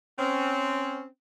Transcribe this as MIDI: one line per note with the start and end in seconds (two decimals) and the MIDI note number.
0.19 1.05 60
0.19 1.05 61